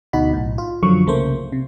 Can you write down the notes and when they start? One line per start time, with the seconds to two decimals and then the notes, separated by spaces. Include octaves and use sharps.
0.13 D2 B2 D#4 F#4 B5
0.33 B1 A2
0.58 F4
0.83 F#2 D3 F3 F#3 C#6
1.06 C2 C#3 A3 A#3 C5
1.52 C3